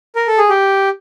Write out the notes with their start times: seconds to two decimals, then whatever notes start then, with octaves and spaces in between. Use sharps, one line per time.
0.16 A#4
0.27 A4
0.38 G#4
0.49 G4